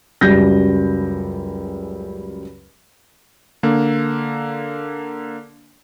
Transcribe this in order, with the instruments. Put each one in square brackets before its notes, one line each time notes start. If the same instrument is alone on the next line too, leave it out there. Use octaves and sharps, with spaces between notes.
[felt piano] C#2 F#2 G3 G6 A#6
[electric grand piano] D3 A#3